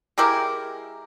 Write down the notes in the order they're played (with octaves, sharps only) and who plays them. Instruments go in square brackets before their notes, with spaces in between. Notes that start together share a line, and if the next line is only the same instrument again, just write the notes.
[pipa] G#3 E4 G4 A#4